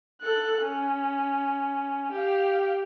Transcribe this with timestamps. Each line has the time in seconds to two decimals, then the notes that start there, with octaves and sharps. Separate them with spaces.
0.22 A4 F#6
0.62 C#4
2.12 G4 F5